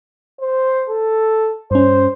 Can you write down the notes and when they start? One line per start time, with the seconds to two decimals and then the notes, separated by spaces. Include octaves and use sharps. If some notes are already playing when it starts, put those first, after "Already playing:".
0.41 C5
0.89 A4
1.71 G2 C#4 C5